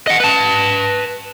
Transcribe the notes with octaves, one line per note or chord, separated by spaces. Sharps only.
D#5 F#5
B4 A5